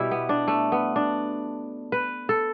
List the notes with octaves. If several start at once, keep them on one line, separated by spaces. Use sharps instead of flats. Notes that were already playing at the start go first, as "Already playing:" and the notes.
Already playing: B2 G3 E4 G4
B3
D4
A3
B3
D4
B4
A4